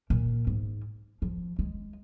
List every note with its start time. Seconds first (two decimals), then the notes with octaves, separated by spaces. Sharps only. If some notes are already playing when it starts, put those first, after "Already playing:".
0.10 A#2
0.47 G#2
1.22 F3
1.59 G#3